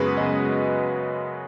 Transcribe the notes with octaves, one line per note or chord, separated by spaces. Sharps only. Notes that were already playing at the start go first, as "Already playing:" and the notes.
Already playing: F#2 C#3 G#3 B3 F#4 G#4 B4
F#2 C#3 G#3 B3 D#5